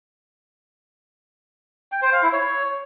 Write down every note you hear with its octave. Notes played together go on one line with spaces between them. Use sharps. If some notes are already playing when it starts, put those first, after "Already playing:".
G5
C5
F5
E4
C#5